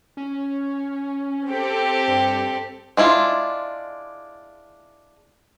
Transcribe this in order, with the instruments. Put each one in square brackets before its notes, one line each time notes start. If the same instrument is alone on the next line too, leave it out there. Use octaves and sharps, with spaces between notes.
[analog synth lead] C#4
[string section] C4 G4 A4
[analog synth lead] G2
[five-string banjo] G#3 D4 E4 F4